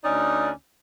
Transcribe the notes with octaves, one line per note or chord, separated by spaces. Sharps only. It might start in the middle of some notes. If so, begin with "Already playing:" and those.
D2 C#4 D#4 D5